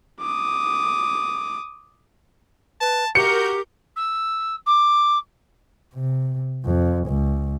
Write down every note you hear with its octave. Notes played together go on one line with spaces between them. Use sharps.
D6 D#6
B4 A5
F#4 G4 A#4 G6 C#7
E6
D6
C3
F2
C#2